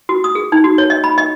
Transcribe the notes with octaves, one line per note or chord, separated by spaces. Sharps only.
F#4
D#6
G#4
D#4
F#4
C#5
D#5
B5
D#5